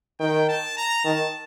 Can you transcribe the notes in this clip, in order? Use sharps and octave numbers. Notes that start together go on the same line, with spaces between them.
D#3 G5
A5
A#5
D#3 A5